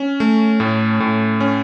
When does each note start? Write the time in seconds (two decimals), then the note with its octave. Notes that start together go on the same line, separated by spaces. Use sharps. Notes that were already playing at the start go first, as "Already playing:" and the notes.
Already playing: C#4
0.20 A3
0.60 A2
1.00 A2
1.40 C#4